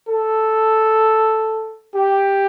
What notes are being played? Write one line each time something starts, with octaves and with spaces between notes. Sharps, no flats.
A4
G4